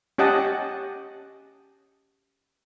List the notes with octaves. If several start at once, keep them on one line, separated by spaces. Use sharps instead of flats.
C#4 G4 D#5 F#5 A5